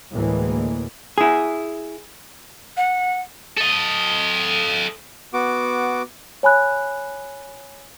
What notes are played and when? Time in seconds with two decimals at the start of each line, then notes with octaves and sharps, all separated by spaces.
0.13 D2 A2 E3 G#3 A#3
1.18 E4 G#4
2.77 F#5
3.58 A4 D#5
5.33 B3 F#4 D6
6.43 C#5 G#5 B5 F#6